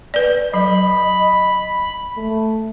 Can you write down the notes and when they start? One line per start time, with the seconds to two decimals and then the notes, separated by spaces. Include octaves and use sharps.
0.14 B4 D5
0.54 F#3 D#5 B5
2.17 A3